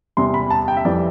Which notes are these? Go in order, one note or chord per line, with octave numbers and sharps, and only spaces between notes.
E2 C3 G3 C6
B5
A5
G5
E5
F2 E3 G3 D5